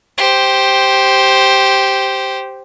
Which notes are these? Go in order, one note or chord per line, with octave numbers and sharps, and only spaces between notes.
G4 C5